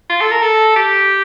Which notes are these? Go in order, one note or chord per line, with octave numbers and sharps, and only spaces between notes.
F4
A4
A#4
A4
G4